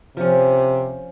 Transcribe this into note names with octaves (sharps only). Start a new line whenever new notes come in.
C3 F3 C#4